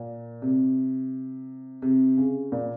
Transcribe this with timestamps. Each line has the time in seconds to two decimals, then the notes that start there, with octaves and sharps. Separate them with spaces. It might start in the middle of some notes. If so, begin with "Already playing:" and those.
Already playing: A#2
0.42 C3
1.82 C3
2.17 C#3
2.52 A#2